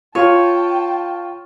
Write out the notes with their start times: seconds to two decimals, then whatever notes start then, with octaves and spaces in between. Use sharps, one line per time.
0.15 F4 C#5 G5 A5